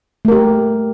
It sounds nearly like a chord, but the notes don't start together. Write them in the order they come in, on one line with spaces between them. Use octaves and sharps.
A3 A#4 G4